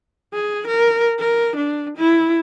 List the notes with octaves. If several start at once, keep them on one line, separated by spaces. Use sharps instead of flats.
G#4
A#4
A#4
D4
E4